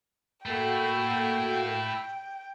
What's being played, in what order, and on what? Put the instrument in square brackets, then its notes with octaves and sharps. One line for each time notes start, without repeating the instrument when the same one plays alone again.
[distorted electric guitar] A3 E4 [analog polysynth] A#3 F#4 A4 [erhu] G5